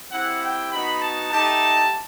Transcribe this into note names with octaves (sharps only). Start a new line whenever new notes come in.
C4 E4 G4 F#5
G5
B3 D#4 F#4 B5
A5
A3 D#4 G4 A5